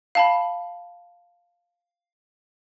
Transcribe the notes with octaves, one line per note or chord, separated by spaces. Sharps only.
F5 A5 B5